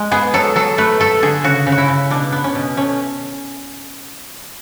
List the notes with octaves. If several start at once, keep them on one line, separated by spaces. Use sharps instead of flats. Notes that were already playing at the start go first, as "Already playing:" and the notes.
Already playing: G#3
B3 G#4
F#3 A4
F#3 A4
A3 B4
A3 A4
D3 G#4
C#3 F#4
C#3
F#4
E4
C#3
B2 D4
B3
C#4
B2
A3 C#4